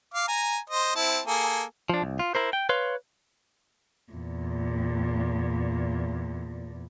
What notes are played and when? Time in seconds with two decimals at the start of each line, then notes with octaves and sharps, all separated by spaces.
0.14 F5 D6
0.28 G#5 A#5
0.70 C5 D#5
0.96 C4 E4 A5
1.26 A#3 G#4 A4
1.89 F3 D4
2.02 C2
2.19 F4
2.35 E4 A#4 C5
2.53 G5
2.69 B4 C#5 F5 C6
4.13 E2 A#2